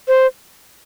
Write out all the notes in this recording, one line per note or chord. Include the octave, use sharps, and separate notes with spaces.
C5